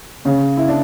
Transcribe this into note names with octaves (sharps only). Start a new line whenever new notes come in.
C#3 C#4
E4
D4